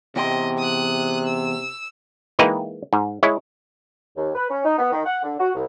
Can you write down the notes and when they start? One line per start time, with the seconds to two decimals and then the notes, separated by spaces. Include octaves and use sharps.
0.16 E2 C3 D#5 G5 C6
0.58 D#6 F#6
1.26 E6
2.39 E3 G#3 A#3 D#4 B4 G5
2.93 G#2
3.23 G#3 E4 C#5
4.16 D#2
4.34 B4
4.50 C#4
4.64 D#4
4.78 B3
4.92 D#3
5.05 F#5
5.23 D3
5.39 F#4
5.55 C2